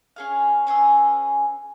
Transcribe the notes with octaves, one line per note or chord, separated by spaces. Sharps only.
C#4 G#4 F5
C#4 G#4 B4 E6